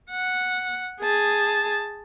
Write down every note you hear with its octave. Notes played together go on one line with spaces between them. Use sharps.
F#5
G#4 A5